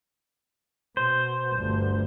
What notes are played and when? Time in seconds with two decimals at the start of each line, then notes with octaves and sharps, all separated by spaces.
0.97 B2 C5
1.54 G1 D2